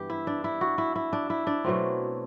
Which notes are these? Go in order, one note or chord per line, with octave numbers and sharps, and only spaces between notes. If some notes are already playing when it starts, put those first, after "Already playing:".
Already playing: G2 E3 B3 G4
E4
D4
E4
F#4
E4
E4
D4
E4
D4
B2 F#3 A3 C4